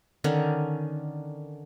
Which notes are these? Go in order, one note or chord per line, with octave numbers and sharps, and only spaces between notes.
D3 D#3 C#4 D4